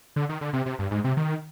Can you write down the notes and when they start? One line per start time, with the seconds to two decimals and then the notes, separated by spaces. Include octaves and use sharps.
0.16 D3
0.29 D#3
0.41 D3
0.53 C3
0.66 C3
0.79 G2
0.91 G#2
1.04 C3
1.17 D#3